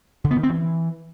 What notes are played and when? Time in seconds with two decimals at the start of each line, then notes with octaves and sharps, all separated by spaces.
0.24 D3
0.31 B3
0.37 D#3
0.43 C4
0.50 E3